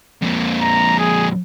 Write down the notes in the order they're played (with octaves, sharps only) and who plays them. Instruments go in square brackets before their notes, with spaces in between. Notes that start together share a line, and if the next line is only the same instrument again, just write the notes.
[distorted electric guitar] F2 A#2
[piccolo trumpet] A#5
G#4